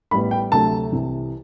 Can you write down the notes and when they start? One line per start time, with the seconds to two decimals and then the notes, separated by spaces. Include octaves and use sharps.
0.11 A1 A2 G3 B3 B5
0.31 G5
0.52 D2 C3 F#3 A3 A5
0.92 C2 C3 E3